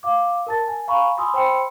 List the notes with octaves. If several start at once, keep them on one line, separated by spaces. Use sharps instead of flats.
F5 D6
A#4 A5 A6
G#5
F5 G#5 A#5 B5 C#6
G#5 B5 C6 D#6 E6
C5 G5 B5 C6 E6 C#7